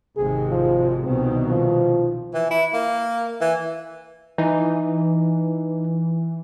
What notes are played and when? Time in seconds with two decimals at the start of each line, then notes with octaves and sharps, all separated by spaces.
0.17 G#1 C3 G#3 G#4
0.51 F3
1.04 C2 B2 D#3 C4
1.49 F3
2.34 E3
2.50 E4
2.73 A#3
3.41 E3
4.38 E3 D#4